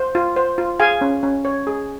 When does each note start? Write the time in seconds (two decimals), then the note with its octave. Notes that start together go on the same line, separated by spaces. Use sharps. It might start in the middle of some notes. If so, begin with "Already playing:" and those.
Already playing: C5
0.15 F4
0.36 C5
0.58 F4
0.80 G#4 F5 G#5
1.01 C#4
1.23 C#4
1.45 C#5
1.67 G#4